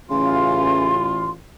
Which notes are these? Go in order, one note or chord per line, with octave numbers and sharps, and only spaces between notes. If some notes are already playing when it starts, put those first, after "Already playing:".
A1 C#3 E3 F4 C6